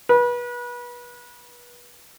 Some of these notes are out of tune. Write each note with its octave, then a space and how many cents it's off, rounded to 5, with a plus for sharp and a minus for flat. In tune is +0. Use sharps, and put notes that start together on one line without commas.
B4 -30